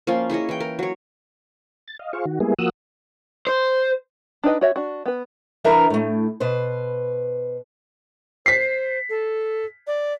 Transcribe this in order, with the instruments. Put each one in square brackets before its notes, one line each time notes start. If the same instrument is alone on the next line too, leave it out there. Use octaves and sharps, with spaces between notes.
[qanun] F3 A#3 C#4 F4
E4 G#4 C#5 D#5
E3 G5
A#4
F#3 C#5
[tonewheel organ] A6
D#5 F5
F4 G#4 C5 F5 C#6
D#3 F#4
G3 G#3 A#3 B3 E4 G#4
F3 A#3 F#4 D#6 E6 F#6
[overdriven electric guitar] C5
[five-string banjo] D4 D#4 B4 D#5
F#4 C#5 E5
D4 F#4
B3 B4
[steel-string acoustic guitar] E3 D4 A#4 B4 E5 A#5
A2 A3
B2 B4 C5
[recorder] C5 [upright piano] B6 C7
[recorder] A4
D5